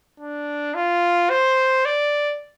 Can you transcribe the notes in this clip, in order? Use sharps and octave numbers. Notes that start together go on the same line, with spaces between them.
D4
F4
C5
D5